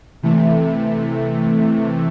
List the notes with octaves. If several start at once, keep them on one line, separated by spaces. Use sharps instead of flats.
C3 E3 A3